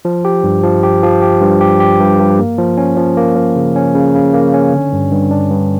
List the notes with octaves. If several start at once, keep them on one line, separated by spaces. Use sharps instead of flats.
F3
G4
G2
F3
G4
F3
G4
G2
G4
G4
G2
G2
A#3
F3
C#4
F3
A#3
F3
C#3
C#4
C#3
C#3
A#3
C#4
D3
G2
G2
D4
G2